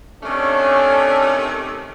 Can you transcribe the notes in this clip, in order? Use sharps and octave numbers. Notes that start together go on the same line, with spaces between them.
C3 D#3 A3 C#4 D4